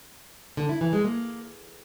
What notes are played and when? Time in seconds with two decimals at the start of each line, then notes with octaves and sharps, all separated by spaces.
0.57 D3
0.69 E4
0.81 E3
0.93 G#3
1.05 A#3